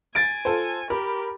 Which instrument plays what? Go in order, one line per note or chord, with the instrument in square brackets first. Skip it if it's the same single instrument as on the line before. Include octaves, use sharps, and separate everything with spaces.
[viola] G#5 [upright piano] A6 D7
[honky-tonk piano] F4 A4 C5
[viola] G4 [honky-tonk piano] A#4 B5